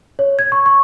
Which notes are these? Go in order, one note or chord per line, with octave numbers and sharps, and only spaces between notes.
C#5
G#6
C#6
C#6